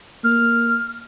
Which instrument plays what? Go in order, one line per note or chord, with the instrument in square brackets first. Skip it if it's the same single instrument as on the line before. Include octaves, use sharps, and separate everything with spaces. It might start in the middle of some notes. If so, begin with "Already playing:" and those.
[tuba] A#3 [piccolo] F6